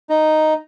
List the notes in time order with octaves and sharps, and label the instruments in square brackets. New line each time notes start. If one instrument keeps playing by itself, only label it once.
[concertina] D#4